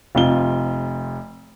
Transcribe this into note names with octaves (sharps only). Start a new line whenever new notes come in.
F1 C3 F4 G7